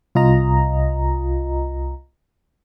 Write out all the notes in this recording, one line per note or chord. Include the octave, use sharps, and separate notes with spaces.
C2 F4 D#5 A#5